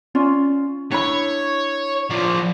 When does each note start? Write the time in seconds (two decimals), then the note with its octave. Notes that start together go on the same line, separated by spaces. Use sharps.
0.15 C#4 F4 D5
0.92 D4 E4 C#5 B5
2.11 F3 D5